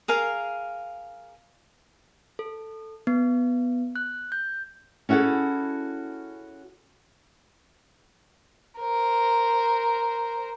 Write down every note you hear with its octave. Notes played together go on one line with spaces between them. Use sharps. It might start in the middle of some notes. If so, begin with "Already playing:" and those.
G#4 A#4 F5
A4
B3
F#6
G6
C#4 E4 F#4 G#4 A4
A#4 C5